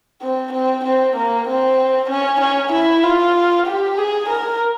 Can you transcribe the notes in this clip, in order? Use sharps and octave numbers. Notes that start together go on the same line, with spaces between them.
C4
C4
C4
A#3
C4
C#4
C#4
E4
F4
G4
G#4
A#4